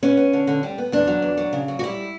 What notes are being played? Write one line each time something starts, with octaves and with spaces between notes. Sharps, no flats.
B3 C#4
B3
D3
D3
G3
B3
E2 D4
F#3
E2
F#3
C#3
F#3
F#4
G3 E4